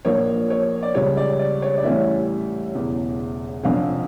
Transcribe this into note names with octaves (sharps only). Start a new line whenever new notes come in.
A#1 A#2 F3 A#3 C#5
C#5
D5
C#2 C#3 G3 C#5
D5
D5
C#5
D5
A1 A2 G3 C#4 E5
E1 E2 C#3
F1 F2 D3 F3 C#4 F5